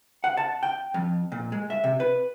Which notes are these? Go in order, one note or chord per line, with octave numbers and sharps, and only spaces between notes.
F#5
A5
G5
F2
A#2
G#3
E5
C3
B4